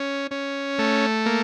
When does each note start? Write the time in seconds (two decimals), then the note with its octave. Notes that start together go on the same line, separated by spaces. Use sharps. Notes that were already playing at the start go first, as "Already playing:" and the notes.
Already playing: C#4
0.31 C#4
0.79 A3
1.26 A#3